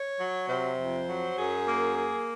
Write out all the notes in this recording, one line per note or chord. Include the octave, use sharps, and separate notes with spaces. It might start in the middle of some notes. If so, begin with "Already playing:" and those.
Already playing: C#5
F#3
C3 C5
F2
F#3
F#2 G#4
A#3
A#3